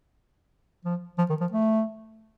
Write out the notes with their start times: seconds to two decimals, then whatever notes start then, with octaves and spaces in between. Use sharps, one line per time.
0.85 F3
1.18 F3
1.29 D#3
1.40 F3
1.52 A3